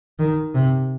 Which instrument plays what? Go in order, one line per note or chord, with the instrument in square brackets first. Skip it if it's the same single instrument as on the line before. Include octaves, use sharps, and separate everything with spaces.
[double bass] D#3
C3